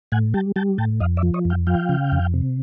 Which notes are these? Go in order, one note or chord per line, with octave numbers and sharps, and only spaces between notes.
A2 F#5 G#5
G3 G5 A5
G3 G5 A5
A2 G5 A5
F2 D#5 F5
D5 E5
F3
C#5 D#5
F2
F5 G5
F3 F5 G5
C#3
F2
C3